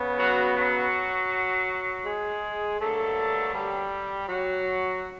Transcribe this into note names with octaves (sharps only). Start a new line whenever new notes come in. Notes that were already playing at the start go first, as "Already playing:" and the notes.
Already playing: C#3 B3
F#3 F#4
F#3 F#4
G#3 G#4
G2 D3 F#3 A3 A#3 A4
G3 G4
F#3 F#4